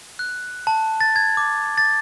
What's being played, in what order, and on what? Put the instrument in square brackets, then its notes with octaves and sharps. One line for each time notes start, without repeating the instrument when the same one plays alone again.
[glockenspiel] F#6
A5
A6
G#6
D6
A6